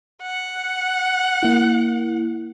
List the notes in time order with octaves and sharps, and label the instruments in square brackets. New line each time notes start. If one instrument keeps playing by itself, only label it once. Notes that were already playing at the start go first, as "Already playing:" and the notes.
[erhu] F#5
[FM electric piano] A#3 E4